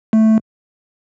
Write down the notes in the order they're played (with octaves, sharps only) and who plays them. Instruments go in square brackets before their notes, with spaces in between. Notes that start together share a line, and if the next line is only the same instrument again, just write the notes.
[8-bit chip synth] A3